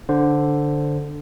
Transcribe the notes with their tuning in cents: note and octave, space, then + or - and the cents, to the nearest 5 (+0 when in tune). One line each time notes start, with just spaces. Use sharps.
D3 +0 C5 +0